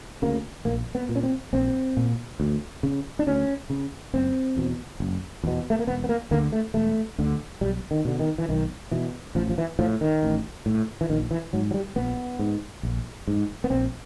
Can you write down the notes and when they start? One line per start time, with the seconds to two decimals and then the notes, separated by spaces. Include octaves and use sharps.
0.22 D2 C#3 A#3
0.65 A#1 A#3
0.95 B3
1.09 A#2
1.16 C#4
1.23 C4
1.53 A#1 C4
1.97 A#2
2.40 D2
2.83 C#3
3.19 D4
3.27 D2 C#4
3.70 C#3
4.14 F#1 C4
4.57 E2 B2
5.00 F#1
5.44 E2 B2
5.70 A3
5.79 A#3
5.87 E1 B3
6.04 B3
6.09 A#3
6.31 D2 D3 A#3
6.52 A3
6.74 E1 A3
7.18 D2 D3
7.61 B1 G3
7.91 D#3
8.05 B2 D3
8.19 D#3
8.38 E3
8.49 B1 D#3
8.91 B2 E3
9.35 A1 F3
9.50 F3
9.58 E3
9.79 A2 F3
10.01 D#3
10.23 A1
10.66 A2
11.01 E3
11.10 A#1 D#3
11.31 E3
11.53 G#2 F#3
11.71 F#3
11.74 G3
11.96 A#1 B3
12.39 G#2
12.83 A#1
13.28 G#2
13.64 B3
13.70 A#1 C4